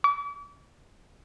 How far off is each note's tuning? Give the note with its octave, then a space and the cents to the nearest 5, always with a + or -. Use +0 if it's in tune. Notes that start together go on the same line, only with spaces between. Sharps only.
D6 -40